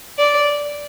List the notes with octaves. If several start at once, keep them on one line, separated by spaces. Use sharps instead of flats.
D5